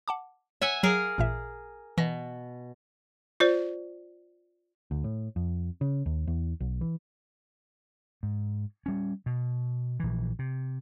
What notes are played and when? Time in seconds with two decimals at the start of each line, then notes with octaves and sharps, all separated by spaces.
0.08 F#5 A5 D6
0.62 C#5 E5 F#5 G#5 E6
0.83 F#3 G#4 A#4 F5
1.18 A1 A#2 E5
1.98 B2 E3 A#6
3.40 F4 C5 D5
4.91 D2
5.04 A2
5.36 F2
5.81 C#3
6.06 D#2
6.27 E2
6.60 B1
6.81 E3
8.23 G#2
8.86 G3 C#4
9.26 B2
10.00 A#1 E3
10.39 C3